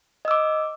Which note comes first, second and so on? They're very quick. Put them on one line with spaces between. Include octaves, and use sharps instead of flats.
D#5 E6 D6